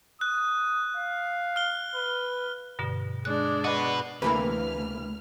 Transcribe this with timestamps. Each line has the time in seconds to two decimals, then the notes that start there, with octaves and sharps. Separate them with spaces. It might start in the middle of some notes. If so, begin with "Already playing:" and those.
0.21 D#6 F#6
0.97 F5
1.56 F6 G7
1.95 B4
2.79 G2 B2 D3
3.25 G#3 D4 F#6
3.64 F#4 B4 D#5
4.22 D2 C3 E3 A#3 B4 F6